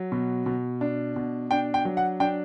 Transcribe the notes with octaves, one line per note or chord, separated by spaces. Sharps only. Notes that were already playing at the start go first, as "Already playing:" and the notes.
Already playing: F#3
B2
B2
D4
B2
D4 G5
G5
F#3
F#5
D4 G5